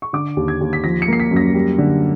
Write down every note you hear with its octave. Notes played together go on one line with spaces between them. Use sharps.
C#6
D3 D6
D#2
G#6
D#2
B6
F3 A#6
C#7
A#3 C7
B6
F#2
A#6
G3
D3